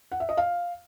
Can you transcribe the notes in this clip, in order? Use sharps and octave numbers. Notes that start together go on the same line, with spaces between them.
F#5
E5
D#5
F5